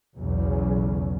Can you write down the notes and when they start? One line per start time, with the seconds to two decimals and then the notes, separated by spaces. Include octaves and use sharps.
0.17 B1 E2 C#3 F#3